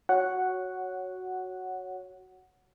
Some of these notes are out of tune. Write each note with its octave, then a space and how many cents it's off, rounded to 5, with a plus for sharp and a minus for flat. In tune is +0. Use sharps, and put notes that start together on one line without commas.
F#4 +0 C#5 +0 F#5 +0